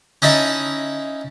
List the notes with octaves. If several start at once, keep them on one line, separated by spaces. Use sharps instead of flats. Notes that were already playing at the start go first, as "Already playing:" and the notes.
C#4 D#4 E4 E5 A5